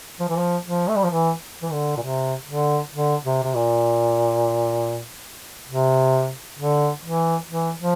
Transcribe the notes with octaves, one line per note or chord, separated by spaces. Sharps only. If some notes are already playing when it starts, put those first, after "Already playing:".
F3
E3
F3
F3
A3
G3
F3
E3
E3
D3
A#2
C3
D3
D3
C3
C3
A#2
C3
D3
E3
E3
F3